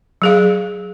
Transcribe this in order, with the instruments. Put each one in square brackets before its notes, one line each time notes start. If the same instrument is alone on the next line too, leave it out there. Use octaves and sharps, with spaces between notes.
[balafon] F#3 G#4 F5